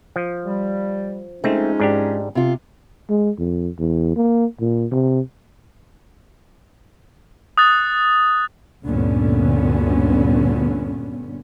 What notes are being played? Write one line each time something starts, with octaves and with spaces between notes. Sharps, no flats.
F3
G3
F3 G#3 A3 C4 C#4 D#4
G#2 D4 G4
C3 F4
G#3
F2
E2
A#3
A#2
C3
D#6 F#6 A6
D2 G2 A#2 D3 B3 C#4